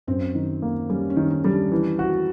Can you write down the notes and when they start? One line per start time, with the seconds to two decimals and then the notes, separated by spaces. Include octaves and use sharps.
0.07 F#2 C4
0.35 D#3
0.62 A#3
0.90 G3 C#4
1.10 C#4
1.16 D#3
1.30 D#4
1.44 G3
1.51 D4
1.72 E3
1.99 F#4